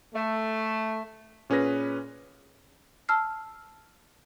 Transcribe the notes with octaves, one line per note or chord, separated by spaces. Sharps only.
A3
A#2 C#4 G#4 B4 A#6
A5 E6 F6 C7